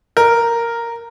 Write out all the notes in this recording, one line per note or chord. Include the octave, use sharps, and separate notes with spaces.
A#4